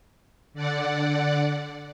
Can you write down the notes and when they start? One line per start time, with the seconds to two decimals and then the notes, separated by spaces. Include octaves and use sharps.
0.54 D3 D5 F#5